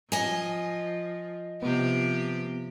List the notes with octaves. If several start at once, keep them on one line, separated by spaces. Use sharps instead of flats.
F3 D#5 G#5
C3 F3 B3 G4